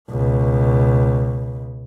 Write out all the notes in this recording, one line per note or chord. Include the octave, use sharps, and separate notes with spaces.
C#2 B2